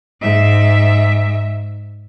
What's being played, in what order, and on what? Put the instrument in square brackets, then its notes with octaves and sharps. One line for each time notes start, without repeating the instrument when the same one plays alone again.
[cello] G#2 E5